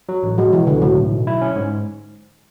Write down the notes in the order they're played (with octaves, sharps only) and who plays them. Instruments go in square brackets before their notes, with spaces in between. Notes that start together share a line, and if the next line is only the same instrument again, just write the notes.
[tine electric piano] F#3
A1
[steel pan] F#3 [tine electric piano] G#3
[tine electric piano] B2 [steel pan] E3
[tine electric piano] C#2 [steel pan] D3
[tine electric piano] A2 [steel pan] F#3
[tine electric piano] B1
B1
E4
C#4
G#2